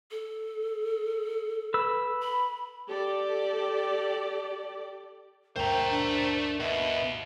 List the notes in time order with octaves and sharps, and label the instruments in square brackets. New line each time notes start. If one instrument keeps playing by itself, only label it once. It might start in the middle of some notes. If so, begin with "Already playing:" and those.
[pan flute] A4
[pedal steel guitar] B4 E6
[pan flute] B5
[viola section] G4 A4 D5
[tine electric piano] D2 G2 A#4 [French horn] A3 [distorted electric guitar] C5 A#5 [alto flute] G5
[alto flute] D4
[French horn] D#2 [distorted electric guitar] B2 [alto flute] E5